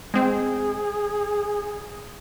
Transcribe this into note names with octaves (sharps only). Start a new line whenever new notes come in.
G#3 C4 G#4